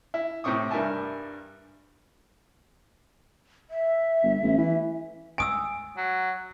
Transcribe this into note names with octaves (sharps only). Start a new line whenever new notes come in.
E4
A2 C3 C4 C#6 D#6
G2 G3 A#4 E5 G#5 A5
E5
G1
A1
E3
G#5 D#6 E6 D7
F#3